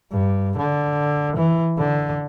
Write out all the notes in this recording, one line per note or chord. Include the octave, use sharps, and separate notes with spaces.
G2
D3
E3
D3